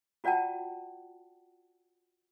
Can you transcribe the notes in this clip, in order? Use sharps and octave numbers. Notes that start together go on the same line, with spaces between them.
F4 F#4 D5 F#5 G5 A5